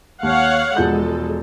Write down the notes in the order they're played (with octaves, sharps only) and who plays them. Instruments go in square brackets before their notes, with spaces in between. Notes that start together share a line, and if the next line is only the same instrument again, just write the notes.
[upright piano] D#2 [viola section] C#5 F5 F#5
[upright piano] E1 F3 G6 [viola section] G#3 A4